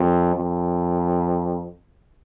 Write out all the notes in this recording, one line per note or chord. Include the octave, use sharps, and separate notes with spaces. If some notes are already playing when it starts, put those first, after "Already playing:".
Already playing: F2
F2